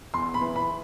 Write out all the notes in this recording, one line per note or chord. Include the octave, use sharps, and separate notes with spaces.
E2 C6
B5
E3
B5